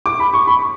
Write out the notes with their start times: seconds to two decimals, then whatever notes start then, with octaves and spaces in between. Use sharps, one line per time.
0.06 D6
0.20 B5
0.33 C#6
0.47 B5